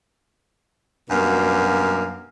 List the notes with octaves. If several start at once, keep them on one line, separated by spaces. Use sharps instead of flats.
F#2 B2 G3 A#3 D4 F5